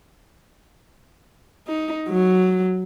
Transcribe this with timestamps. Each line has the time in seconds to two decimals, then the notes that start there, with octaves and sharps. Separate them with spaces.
1.67 D#4
2.09 F#3